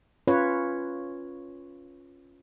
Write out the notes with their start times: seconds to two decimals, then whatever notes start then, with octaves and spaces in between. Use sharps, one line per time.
0.27 C#4 F4 B4 C#5